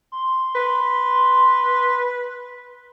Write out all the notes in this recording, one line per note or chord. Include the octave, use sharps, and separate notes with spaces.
C6
B4